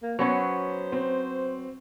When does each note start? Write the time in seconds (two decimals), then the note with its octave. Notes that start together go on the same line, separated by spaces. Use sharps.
0.03 A#3
0.19 F#3 B3 C#4 C5
0.92 C4